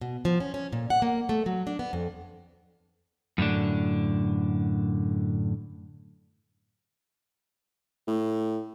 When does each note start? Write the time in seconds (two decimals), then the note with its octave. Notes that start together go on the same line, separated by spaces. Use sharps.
0.01 B2
0.25 F3
0.40 C#4
0.54 C#4
0.73 A#2
0.90 F#5
1.02 A#3
1.29 A3
1.46 F#3
1.67 D4
1.79 B3
1.93 F2
3.38 F#2 A2 D3 D4
8.07 A2